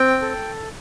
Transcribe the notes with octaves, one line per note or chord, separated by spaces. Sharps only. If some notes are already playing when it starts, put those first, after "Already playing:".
Already playing: C4 G5
A4